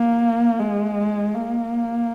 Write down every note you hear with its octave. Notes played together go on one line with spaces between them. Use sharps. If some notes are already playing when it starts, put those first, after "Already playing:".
Already playing: A#3
G#3
A#3